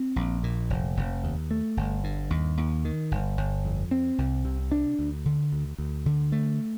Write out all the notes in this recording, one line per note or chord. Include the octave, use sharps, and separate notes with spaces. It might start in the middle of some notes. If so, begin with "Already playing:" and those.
Already playing: C4
A#1
A#2
F1
F1
D#2
A3
G1
G2
D#2
D#2
D#3
G1
G1
F2
C4
C2
C3
D4
D2
D3
D2
D2
D3
A3